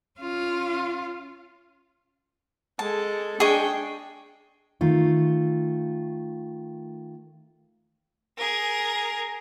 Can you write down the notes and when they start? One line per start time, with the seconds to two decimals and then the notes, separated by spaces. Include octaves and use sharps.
0.20 C#4 F4
2.79 G#3 A4 A5
3.40 D4 G#4 D#5 G5 C#6
4.81 D#3 A3 F4
8.37 G#4 A#4